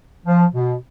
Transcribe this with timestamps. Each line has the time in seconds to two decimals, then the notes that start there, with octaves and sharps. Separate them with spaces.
0.26 F3
0.54 B2